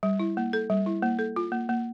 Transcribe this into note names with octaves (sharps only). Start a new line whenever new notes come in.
G3
E4
A#3
A4
G3
E4
A#3
A4
F4
A#3
A#3